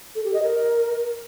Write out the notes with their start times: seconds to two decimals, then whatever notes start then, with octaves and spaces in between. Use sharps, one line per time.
0.15 A4
0.24 G4
0.34 D#5
0.43 A#4